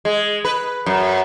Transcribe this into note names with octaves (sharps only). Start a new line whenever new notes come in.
G#3
B4
F#2